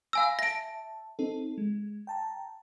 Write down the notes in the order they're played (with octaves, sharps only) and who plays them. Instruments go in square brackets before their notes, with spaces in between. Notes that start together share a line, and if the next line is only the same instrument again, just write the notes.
[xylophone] F5 G#5 E6 [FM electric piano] B5 A#6
[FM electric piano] E5 A5 [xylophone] A#6 D7
[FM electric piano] C4 D#4 A4
G#3
G5 A5 A#5